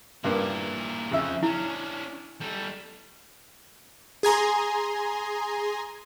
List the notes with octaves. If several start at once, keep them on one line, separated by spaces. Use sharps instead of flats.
G2 A#2 A#3 B3 E4
F2 C#3 F3 E5
C#4 D4 E4
G3 A4
G#4 G#5 A#5 C6